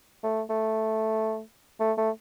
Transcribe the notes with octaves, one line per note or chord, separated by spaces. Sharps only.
A3
A3
A3
A3